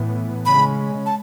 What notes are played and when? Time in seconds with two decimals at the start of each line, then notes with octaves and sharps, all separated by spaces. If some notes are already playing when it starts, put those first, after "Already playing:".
Already playing: A2 E3 B3
0.46 C#3 G#3 C#4 B5
1.06 A5